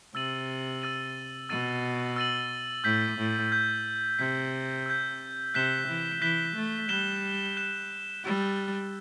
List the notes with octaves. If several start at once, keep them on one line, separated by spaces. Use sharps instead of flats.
C3 E6 A6 D#7 F#7
E6 A6 D#7 F#7
B2 E6 A6 D#7 F#7
E6 A6 D#7 F#7
A2 E6 G6 B6
A2
E6 G6 B6
C3 E6 G6 B6
E6 G6 B6
C3 F#6 B6 E7 G7
E3
E3 F#6 B6 E7 G7
A3
G3 F#6 B6 E7 G7
F#6 B6 E7 G7
G3 E6 A6 E7